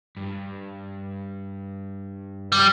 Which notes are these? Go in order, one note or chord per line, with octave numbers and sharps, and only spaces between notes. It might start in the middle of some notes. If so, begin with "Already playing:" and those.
G2
G3